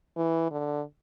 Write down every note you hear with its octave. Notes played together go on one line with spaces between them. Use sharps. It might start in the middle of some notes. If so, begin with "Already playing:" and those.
E3
D3